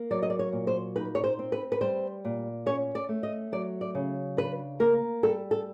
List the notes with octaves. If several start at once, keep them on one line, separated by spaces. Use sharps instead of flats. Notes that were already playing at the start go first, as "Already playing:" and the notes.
Already playing: A#3
F#3 D5
D#5
D5
C#5
A#2
C5
D#4 B4
C#5
C5
C4
B4
B4
G3 C5
A#2
C#4 C#5
D5
A3
D#5
F#3 D5
D5
C#3
D4 B4
A#3 A#4
G3 A4
A4